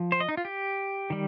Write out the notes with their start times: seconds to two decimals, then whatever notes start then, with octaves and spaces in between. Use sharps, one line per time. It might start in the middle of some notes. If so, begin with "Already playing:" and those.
Already playing: F3
0.12 C5
0.20 D#5
0.29 D#4
0.37 F4
0.45 G4
1.10 D#3 G3